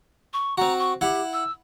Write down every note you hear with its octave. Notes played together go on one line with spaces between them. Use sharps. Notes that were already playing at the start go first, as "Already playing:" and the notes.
C#6
C4 F#4 A#5
C#6
E4 G4 F#5
E6